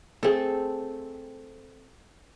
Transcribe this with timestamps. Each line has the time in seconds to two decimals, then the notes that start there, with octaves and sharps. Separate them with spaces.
0.23 A3 C4 G#4 A4